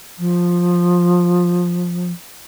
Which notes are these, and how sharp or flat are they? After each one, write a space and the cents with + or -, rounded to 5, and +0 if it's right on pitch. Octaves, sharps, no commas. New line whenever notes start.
F3 +10